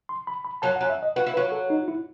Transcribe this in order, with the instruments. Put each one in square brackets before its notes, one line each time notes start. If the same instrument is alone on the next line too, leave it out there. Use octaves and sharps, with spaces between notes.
[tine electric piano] C6
B5
B5
[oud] F#2 F#3 [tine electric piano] A5
[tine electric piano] F#5
[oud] F#2 F#3
[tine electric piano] E5
D#5
[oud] F#4 [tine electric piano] B4
[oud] E4
[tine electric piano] B4
[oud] F#3 F#4
[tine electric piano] A4
D#4
E4